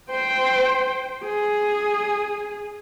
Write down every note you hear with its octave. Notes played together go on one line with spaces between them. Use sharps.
C5 G5
G#4